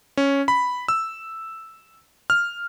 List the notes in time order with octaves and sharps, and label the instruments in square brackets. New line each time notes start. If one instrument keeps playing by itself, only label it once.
[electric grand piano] C#4
B5
E6
F6